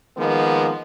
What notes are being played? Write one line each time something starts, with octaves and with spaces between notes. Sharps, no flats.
D#3 F3 G#3 A#3 B3